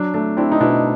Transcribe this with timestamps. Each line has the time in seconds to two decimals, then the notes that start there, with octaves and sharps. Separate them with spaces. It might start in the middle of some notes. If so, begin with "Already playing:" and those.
Already playing: F#3 D4
0.14 A3 D4
0.37 C4 D4 E4
0.52 D#4
0.60 B2 D4 E4